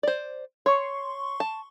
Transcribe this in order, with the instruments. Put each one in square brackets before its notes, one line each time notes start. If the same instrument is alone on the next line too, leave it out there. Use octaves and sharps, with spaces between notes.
[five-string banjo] C5 D5
[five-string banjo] C#5 [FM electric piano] C6 C#6
[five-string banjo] A5